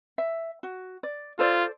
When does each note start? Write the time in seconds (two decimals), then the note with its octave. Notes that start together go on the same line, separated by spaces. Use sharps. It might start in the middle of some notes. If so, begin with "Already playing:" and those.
0.18 E5
0.63 F#4
1.03 D5
1.39 F4 A4 C5 D5